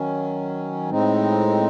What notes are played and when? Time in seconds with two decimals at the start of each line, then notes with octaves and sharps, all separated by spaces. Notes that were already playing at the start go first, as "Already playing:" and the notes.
Already playing: D#3 F#3 C#4
0.90 A2 G#3 C4 D#4